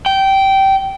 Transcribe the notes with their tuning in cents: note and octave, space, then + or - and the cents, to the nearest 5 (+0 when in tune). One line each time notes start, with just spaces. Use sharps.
G5 -15